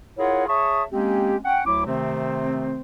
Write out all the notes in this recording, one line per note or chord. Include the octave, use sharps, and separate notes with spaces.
E4 F4 G#4 A#4 C#5 F#5
G#4 C#5 E5 A5 C#6 D#6
G#3 A#3 C4 C#4 G4
C#4 F#5 G5
D2 F#3 E4 D6
C3 D#3 A3 C4